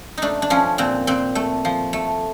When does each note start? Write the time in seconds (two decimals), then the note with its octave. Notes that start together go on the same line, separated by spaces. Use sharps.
0.17 A3 D4 D#4
0.42 D4
0.50 F3 C#4
0.78 A#2 C4
1.07 A#2 C4
1.35 A3
1.65 F3
1.93 A3